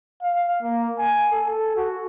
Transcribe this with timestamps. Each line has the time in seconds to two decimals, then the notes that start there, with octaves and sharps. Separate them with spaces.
0.22 F5
0.63 A#3
0.99 G#5
1.32 A4
1.76 F#4